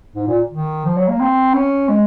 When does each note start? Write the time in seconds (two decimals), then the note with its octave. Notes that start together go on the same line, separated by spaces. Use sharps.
0.15 G#2
0.27 A#2
0.50 D#3
0.85 F3
0.97 F#3
1.08 A#3
1.20 C4
1.54 C#4
1.89 G#3